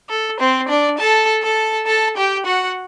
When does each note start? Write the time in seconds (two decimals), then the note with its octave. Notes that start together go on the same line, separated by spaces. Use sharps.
0.09 A4
0.39 C4 C5
0.68 D4 D5
0.98 A4 A5
1.43 A4 A5
1.86 A4 A5
2.17 G4 G5
2.45 F#4 F#5